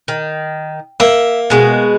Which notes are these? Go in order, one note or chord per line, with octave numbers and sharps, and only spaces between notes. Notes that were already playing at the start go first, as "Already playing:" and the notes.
D#3
A#3 E5
B2 G#3 F#4